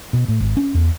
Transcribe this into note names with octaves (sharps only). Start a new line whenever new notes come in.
B2
A2
G#1
C#4
E2